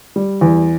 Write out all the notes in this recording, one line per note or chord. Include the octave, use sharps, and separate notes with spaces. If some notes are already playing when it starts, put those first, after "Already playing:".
G3
E2